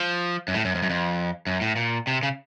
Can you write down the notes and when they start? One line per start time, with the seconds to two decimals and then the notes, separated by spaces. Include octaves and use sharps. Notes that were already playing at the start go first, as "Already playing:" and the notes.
Already playing: F3
0.48 F#2
0.54 A2
0.65 F#2
0.75 F2
0.83 F#2
0.90 F2
1.47 F#2
1.61 A2
1.76 A#2
2.07 C3
2.23 C#3